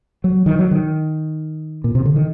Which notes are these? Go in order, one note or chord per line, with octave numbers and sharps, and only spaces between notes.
F#3
D#3
F#3
D#3
A#2
C3
D3
D#3